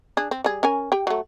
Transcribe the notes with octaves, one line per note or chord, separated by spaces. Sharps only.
D4 G#4
C4
G3 G#4
C#4 A#4 G#5
G4 G5
F#3 A3